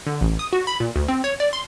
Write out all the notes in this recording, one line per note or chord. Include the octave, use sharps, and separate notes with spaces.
D3
A1
D#6
F#4
B5
A#2
D2
C4
C#5
D5
C6